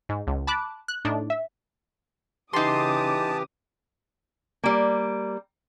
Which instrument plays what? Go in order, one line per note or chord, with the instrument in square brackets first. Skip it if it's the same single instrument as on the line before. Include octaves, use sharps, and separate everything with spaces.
[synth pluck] G#2
C#2
A5 B5 D6 F#6
F#6
A2 D4 D#4
E5
[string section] C#3 D6 D#6 [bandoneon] E3 G4 [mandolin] D#4 C6 [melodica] A5
[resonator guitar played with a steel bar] G3 A#3